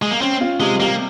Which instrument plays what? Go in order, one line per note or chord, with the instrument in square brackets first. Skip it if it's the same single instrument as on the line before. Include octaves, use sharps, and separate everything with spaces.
[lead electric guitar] G#3
A#3
[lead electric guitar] C4 [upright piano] C#4
[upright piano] F4
[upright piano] C3 [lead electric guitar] G#3
[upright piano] G3 [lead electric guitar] A#3